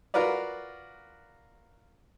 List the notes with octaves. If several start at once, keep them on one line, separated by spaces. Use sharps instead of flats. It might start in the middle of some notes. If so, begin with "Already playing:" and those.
F4 F#4 A#4 B4 D5